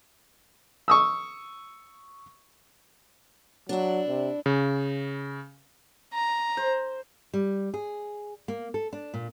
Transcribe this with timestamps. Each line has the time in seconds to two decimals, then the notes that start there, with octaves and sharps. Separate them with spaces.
0.88 C#6 D#6 E6
3.69 F#3 D4 E4
4.08 C3
4.46 C#3
6.13 A#5
6.57 C5
7.34 G3
7.74 G#4
8.48 A#3
8.74 A4
8.93 D4
9.14 A#2